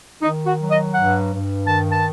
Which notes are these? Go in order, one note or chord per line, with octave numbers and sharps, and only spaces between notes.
D#3 D#4
F#4
F#3
D#5
G2 F#5
G2
D#3 A5
A5